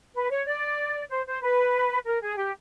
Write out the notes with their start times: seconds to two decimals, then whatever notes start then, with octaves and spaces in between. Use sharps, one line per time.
0.15 B4
0.31 C#5
0.47 D5
1.10 C5
1.26 C5
1.42 B4
2.06 A#4
2.22 G#4
2.37 G4